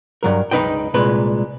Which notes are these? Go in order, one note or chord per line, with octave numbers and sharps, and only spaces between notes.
G2 F#3 A#4
C#2 D#4 B4 D#5 G5
C2 A#2 G#3 B4